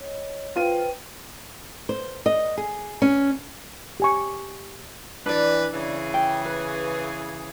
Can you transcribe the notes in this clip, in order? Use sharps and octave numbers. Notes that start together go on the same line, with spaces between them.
C#5 D#5
F4 B4 C5 G5 D#7
C5
D#5
G#4
C#4
G4 G#5 C#6
E3 D4 B4 D5
C#3 E3 G#4
G5
B4